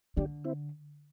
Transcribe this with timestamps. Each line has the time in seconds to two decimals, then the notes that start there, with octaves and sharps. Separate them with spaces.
0.17 D3 D4 G4
0.44 C4 E4